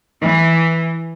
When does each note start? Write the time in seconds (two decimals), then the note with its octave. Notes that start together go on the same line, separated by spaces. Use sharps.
0.23 E3